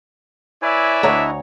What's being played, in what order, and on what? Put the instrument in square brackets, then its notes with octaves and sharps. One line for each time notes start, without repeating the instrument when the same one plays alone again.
[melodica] E4 C#5 G#5 [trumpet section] B4 D5 E5
[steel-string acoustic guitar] D2 C#5 A#5 [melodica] D4 E4 D#5